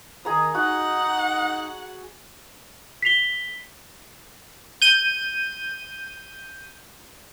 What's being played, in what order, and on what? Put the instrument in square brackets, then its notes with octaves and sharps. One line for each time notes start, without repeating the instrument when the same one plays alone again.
[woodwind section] D#3 D#5 D#6 [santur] G#4 G#5 A#5
[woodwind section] D#4 [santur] F#4 [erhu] F#5
[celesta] B6 C7 F7 G7
[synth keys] G6 D#7